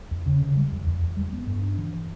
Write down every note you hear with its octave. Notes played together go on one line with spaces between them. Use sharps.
E2
C#3
C#3
G3
E2
E2
E2
G3
B3
G2
D4
E3